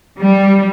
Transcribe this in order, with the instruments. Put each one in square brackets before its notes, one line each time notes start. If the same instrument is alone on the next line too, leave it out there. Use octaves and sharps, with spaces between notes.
[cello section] G3